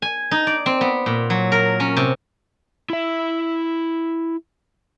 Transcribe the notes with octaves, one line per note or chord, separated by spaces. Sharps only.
G#5
D#4
D5
C4
B3
A#2
F#3
A#4
C#4
C3
E4 E5